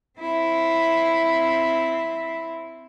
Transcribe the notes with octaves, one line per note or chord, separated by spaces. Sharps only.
C4 E4